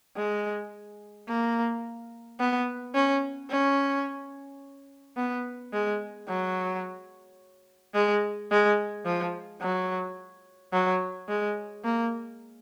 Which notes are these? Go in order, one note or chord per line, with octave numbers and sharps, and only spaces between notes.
G#3
A#3
B3
C#4
C#4
B3
G#3
F#3
G#3
G#3
F3
F#3
F#3
G#3
A#3